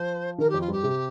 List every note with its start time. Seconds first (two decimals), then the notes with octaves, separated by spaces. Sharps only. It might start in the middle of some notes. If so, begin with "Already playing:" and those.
Already playing: F3 C5
0.38 D#3 A#4
0.49 F2 G4
0.60 F4
0.68 G2 G4
0.84 C3